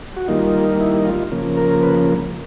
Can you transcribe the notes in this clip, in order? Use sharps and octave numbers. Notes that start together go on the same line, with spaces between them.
F#4
D#3 G3 A#3 D#4 F4
E4
F4
C#3 F3 A#3
A#4
B4